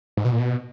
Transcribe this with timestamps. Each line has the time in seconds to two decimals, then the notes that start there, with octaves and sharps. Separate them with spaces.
0.17 G#2
0.25 B2
0.32 A#2
0.39 B2